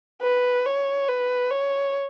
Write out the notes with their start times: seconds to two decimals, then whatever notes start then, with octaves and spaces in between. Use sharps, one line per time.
0.22 B4
0.66 C#5
1.09 B4
1.51 C#5